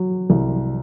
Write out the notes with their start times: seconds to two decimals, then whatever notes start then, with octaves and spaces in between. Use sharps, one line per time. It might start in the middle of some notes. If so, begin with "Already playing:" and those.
Already playing: F#3
0.30 C2